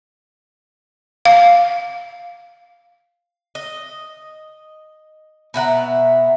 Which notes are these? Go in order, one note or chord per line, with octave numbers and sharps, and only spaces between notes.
F5
D#5
B2 E5 F#5 A#5